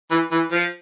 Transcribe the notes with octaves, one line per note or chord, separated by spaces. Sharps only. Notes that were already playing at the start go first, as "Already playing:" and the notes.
E3
E3
F3